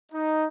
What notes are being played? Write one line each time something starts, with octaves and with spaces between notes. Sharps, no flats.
D#4